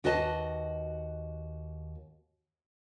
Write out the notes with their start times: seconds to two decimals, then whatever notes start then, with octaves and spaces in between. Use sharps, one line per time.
0.04 D#2 F#4 B4 D#5 A5